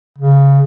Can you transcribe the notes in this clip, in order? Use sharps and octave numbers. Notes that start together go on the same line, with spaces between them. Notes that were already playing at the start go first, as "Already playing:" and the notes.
C#3